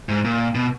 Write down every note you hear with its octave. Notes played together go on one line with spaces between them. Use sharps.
G#2
A#2
B2